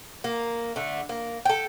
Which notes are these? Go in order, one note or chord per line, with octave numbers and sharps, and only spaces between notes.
A#3
D3 A3
A#3
A4 G5